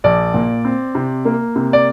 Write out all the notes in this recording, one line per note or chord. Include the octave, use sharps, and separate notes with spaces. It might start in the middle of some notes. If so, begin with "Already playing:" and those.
A#1 D5
A#2
C4
C3
A#3
C3
D5